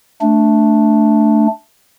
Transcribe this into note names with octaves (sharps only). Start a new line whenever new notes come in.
A3 D4